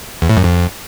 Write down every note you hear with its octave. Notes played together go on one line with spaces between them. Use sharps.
E2
A2
F#2
F2